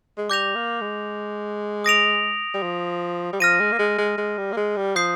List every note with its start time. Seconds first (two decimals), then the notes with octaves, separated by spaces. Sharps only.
0.17 G#3
0.30 G3 D6 G6 A#6 F7
0.55 A#3
0.81 G#3
1.84 D#6 A#6 D7 F7
2.54 G3
2.62 F3
3.33 G3
3.40 F3 F6 A#6 D#7
3.60 G#3
3.72 A#3
3.79 G#3
3.98 G#3
4.18 G#3
4.38 G3
4.53 A#3
4.57 G#3
4.77 G3
4.96 F3 D#6 G6 C7